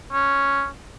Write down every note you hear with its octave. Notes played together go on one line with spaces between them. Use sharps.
C#4